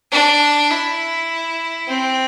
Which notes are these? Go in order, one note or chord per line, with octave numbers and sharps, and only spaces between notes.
D4
E4
C4